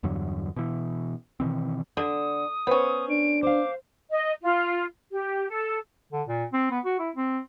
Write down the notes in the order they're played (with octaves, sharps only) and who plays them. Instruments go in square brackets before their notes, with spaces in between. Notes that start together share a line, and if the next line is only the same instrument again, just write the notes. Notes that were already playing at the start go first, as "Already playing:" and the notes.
[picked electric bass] E2 G2 D3 F#3
B2 E3
B2 D#3 E3 C4
[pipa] D3 [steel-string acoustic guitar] A4 [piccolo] D#6
[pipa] B3 C#4 [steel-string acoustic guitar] C5
[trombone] D4 [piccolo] D7
[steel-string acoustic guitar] C5 F5 [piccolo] D6
[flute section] D#5
F4
G4
A4
[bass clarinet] D3
A#2
C4
B3
F#4
E4
C4